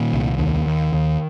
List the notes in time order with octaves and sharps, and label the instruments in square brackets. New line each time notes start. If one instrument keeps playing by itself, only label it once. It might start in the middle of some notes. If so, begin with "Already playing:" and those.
Already playing: [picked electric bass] A#2 D#3
C2
D#2
D#2
D#2